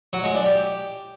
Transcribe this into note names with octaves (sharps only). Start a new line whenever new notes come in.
F#3
G#3
D4
G4